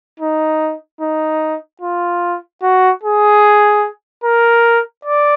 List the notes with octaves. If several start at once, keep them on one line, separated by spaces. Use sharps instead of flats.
D#4
D#4
F4
F#4
G#4
A#4
D5